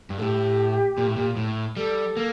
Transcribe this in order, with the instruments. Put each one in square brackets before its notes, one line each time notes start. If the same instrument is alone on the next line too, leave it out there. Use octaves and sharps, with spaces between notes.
[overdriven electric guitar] G2
[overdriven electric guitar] A2 [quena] G4 A4
[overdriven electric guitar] A#2
A2
A#2
A2
[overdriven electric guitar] G3 [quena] A4
[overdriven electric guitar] A#3